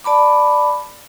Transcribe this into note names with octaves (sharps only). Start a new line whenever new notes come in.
D5 A5 B5 D6